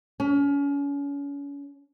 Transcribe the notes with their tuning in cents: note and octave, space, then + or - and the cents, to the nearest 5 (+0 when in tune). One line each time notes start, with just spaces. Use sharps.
C#4 +35